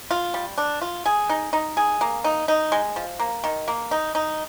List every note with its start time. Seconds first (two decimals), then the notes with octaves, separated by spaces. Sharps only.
0.11 F4
0.34 G3
0.58 D4
0.82 F4
1.06 G#4
1.29 D#4
1.53 D#4
1.77 G#4
2.01 A#3
2.24 D#4
2.48 D#4
2.72 G#3
2.96 F3
3.19 A#3
3.44 D#3
3.68 A#3
3.91 D#4
4.15 D#4